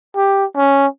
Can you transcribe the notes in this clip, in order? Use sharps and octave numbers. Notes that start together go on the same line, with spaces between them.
G4
C#4